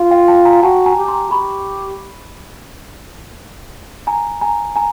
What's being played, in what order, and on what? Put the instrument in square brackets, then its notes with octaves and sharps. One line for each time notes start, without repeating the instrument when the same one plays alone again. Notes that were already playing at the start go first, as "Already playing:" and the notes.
Already playing: [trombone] F4
[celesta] F5 G5
G5 A5
G#5 A#5
[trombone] F#4 [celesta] G5 A5
[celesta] G#5 A#5
[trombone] G4
[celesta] A#5 C6
[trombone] G4 [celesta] B5 C#6
[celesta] G#5 A#5
G#5 A#5
G#5 A#5